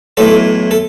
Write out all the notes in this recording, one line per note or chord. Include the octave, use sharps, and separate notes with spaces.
B1 A2 E3 A4
A4